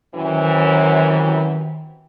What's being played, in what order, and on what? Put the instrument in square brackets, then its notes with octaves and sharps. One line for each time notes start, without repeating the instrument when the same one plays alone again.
[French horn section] F#2 C3 E3 [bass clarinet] D#3